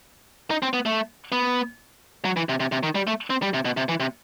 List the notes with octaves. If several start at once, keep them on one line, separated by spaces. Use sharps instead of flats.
D#4
C4
B3
A3
B3
F#3
E3
C3
C3
C3
D#3
G3
A3
C4
G3
C3
B2
C3
E3
C3